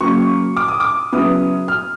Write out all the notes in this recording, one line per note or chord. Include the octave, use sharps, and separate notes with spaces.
C#3 F#3 A#3 C#6
D6
D#6
D6
C#3 F#3 B3 E4 D#6
F6